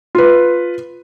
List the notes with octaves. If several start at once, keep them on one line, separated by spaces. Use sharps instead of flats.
F4 B4